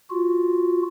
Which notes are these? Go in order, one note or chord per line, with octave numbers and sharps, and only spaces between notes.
F4 F#4